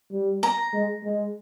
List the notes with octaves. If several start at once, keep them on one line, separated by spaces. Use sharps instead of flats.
G3
A#5
G#3
G#3